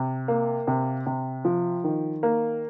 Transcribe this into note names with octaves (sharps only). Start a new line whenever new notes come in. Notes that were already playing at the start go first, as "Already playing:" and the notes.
Already playing: C3
A#3
C3
C3
F3
D#3
A#3